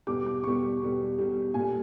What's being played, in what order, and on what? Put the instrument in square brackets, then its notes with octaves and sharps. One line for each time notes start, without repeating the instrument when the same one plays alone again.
[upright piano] E2 B2 G3 D6
D6
E2 B2 G3 C#6
E2 B2 G3
E2 B2 G3
A#2 G3 G#5